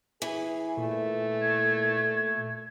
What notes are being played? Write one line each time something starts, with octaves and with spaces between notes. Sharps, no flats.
E3 G#4
A#2 A3
G#6